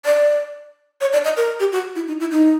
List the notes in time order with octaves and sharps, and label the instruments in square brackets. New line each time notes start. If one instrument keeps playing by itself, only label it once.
[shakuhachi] D5
C#5
D5
D#5
A#4
G4
F#4
E4
D#4
E4
D#4